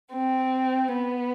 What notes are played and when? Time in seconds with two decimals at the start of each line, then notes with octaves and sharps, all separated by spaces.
0.11 C4
0.91 B3